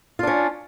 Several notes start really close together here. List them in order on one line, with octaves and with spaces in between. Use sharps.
F4 D4 C#4